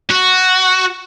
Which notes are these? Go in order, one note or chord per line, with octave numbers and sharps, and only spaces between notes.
F#4